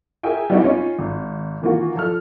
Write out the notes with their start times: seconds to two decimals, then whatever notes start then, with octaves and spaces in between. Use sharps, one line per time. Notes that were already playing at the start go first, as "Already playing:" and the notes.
0.23 G#4 A#4 E5 G5 G#5
0.50 G3 B3 D#4 E4 F#4
0.64 C#4 D#4 F4 C#5
0.99 G#1
1.62 D#3 E3 A#3 F4 F#4
1.96 F3 A4 F6